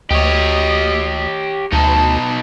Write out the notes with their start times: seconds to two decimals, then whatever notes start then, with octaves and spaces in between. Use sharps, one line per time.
0.11 D2 G4 C#5 D#5
1.73 D2 B2 D#4 A5